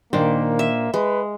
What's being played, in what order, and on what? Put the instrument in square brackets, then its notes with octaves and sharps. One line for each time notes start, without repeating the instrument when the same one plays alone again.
[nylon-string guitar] A#2 D4 C5 [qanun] D#3 [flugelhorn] A#3
[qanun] E5
[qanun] G#3 [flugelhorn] B4